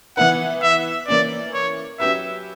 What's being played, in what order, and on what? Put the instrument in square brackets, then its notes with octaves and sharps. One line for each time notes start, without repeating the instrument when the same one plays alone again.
[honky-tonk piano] E3 B3 E4 B4 [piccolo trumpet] F#5
[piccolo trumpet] E5
[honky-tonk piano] E3 A#3 C#4 [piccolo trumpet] D5
[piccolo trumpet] C#5
[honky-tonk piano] F#3 C#4 G4 B4 [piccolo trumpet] E5